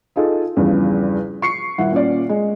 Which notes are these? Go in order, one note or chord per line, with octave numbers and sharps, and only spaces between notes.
D#4 F4 G#4 A4
E2 G2 C#3 F3
C#6 C7 C#7
D#1 E4 F#5
A#2 C#4 D5
G#3